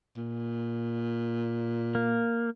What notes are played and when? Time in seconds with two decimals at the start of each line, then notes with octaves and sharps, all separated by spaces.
0.17 A#2
1.95 A#3